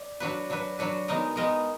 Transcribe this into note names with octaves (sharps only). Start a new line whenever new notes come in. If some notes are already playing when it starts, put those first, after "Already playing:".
Already playing: D5
F#3 D4 F#4 B4
F#3 D4 F#4 B4
F#3 D4 F#4 B4
G#3 B3 D#4 A#4 D#5
G#3 B3 D#4 A#4 D#5